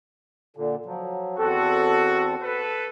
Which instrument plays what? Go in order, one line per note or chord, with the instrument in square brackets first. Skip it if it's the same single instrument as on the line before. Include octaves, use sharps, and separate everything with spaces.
[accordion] A#2 D3
F3 F#3
[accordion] E2 C4 A4 [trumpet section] F#4
[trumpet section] A4 B4